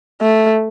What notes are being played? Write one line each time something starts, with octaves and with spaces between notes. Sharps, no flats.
A3